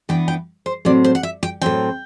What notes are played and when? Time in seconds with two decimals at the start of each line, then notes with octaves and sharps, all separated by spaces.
0.09 E3 B3 D4 G5
0.28 G5
0.66 C5
0.85 A2 F#3 C4 D5
1.04 C5
1.15 F#5
1.23 E5
1.43 G5
1.62 A2 F#3 C4 G5